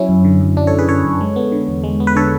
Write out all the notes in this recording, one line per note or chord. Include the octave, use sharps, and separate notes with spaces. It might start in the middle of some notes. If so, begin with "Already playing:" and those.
Already playing: F#3 C#4 E4
F#2
D3
F#2
F#3 D4
A4 C#5
F#2
G#4 B4
D3 A4 C#5
F#2
G#3
B3
D3
E2
G#3
B3
B4
D3 A4 C#5